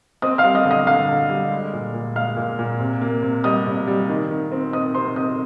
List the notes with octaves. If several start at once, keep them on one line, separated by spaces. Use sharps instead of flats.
C4 D#5 D#6
F5 F6
G3
D#5 D#6
D3
D#5 D#6
D3 F5 F6
D3
G3
G#3
A#2
A#2
G#3 F5 F6
A#2
A#2
C3
A#3
C3
G3 D#5 D#6
C3
G3
D#3
D#3
C4
C4 D#5 D#6
C3 C5 C6
C4 D#5 D#6